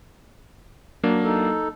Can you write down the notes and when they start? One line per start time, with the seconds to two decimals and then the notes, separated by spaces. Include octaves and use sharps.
1.03 F#3 A#3 D4
1.23 D#4 A4